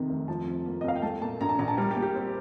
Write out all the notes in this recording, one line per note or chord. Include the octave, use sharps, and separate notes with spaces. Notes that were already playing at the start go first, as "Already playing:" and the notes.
Already playing: F2 C3 D#3
F1
F3 A5
C3
A#3
D#5
C2 F5
G5
A3 A5
A#2 A5
A#1 A#5
A5
A#1 A#5
A5
G3 A#4
G4
A#2
G4
C4